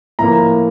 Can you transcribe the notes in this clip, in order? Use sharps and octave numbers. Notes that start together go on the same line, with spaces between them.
A2 F3 A#3 A#5